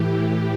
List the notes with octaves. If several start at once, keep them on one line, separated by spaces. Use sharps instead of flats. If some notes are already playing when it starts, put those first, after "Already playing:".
Already playing: A2 E3 G4